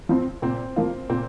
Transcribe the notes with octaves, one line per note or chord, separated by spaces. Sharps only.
F3 C4 F4
A#2 C4
F3 A#3 F4
A#2 C4